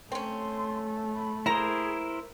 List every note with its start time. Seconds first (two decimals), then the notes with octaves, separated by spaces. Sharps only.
0.12 A3 C4 C#4 C6
1.15 B5
1.46 A#3 E4 G#4 A#4 C5 A#5